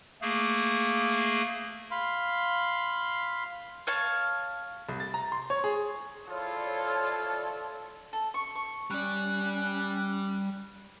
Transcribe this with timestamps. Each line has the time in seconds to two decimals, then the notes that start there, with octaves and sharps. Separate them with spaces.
0.21 A3 A#3 G#4
1.91 F5 B5 C6
3.87 C#5 F5 A5
4.89 C2
5.00 A6
5.14 A#5
5.32 C6
5.50 C#5
5.64 G#4
6.29 F3 E4 F4 A4 C#5 D5
8.13 A4
8.34 C#6
8.55 C#6
8.90 G3 C#4 D5 F#6